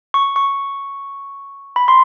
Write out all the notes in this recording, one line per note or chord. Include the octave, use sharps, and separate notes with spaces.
C#6
C#6
B5
C6